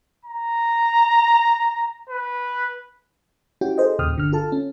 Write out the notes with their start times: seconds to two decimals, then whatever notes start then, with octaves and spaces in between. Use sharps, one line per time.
0.25 A#5
2.09 B4
3.61 C#4 E4 F#4 G4 G5
3.78 G#4 A4 C5 D#5
3.99 D#2 A#2 C#3 G5 D#6 F6
4.16 G1 D3 F6
4.32 F4 A4 A5
4.52 C#4